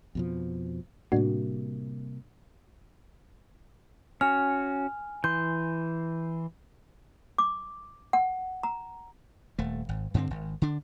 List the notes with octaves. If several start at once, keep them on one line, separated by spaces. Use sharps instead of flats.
F2 B2 F3
A2 C3 G3 A#3 D4 F#4
C#4 F#4 G#5 F6
E3 C6 G6
D6
F#5
A#5
D#1 A3
G#1
G2 D3 B3 C4
G#1
D3 D4